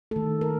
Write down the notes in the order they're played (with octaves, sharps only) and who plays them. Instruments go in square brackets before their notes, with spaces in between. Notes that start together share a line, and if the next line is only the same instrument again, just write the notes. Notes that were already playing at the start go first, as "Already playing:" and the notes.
[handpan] D#3 A3 A4
A#4